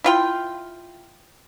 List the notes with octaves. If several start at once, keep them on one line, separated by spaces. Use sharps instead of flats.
E4 F4 G5